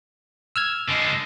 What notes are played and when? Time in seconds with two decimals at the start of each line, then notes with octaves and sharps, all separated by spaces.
0.56 E6 F6 G#6
0.89 D3 G#3